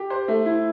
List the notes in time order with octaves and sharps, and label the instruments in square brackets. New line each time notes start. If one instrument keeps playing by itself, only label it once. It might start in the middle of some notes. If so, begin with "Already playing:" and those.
Already playing: [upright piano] G4
C5
A3
E4